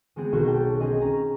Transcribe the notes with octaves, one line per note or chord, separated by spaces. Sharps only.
G#3 B3 C4 G#4
B1 D#3 F#4 A#4 C5
G5 A5
C4 C#4 G#4 D#5
C#4 A#5